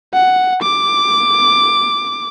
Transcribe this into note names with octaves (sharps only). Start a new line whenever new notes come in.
F#5
D6